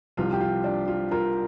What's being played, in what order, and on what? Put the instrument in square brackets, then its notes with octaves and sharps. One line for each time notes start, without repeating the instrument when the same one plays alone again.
[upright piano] C2 C3 F3 F4
G4
F4
D4
F4
F4 A#4